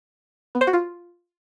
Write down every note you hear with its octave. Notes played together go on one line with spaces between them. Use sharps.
B3
C5
F#4
F4